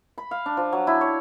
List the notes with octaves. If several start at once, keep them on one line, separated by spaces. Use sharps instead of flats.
B5
F5
D4
F3
F#3
E4
C#5